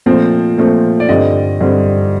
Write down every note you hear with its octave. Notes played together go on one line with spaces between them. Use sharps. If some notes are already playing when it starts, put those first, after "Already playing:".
A#2 F3 A3 C4
A#2 F3 A3 C4
D5
G2 D3 G3 C4 D#5
G2 D3 G3 C4